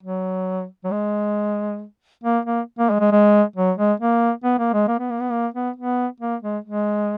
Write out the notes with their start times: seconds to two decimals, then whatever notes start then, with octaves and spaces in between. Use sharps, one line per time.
0.03 F#3
0.84 F#3
0.91 G#3
2.24 A#3
2.45 A#3
2.79 A#3
2.90 G#3
3.00 G#3
3.12 G#3
3.56 F#3
3.78 G#3
4.00 A#3
4.44 B3
4.59 A#3
4.73 G#3
4.88 A#3
4.99 B3
5.10 A#3
5.21 B3
5.32 A#3
5.54 B3
5.76 B3
6.20 A#3
6.43 G#3
6.64 G#3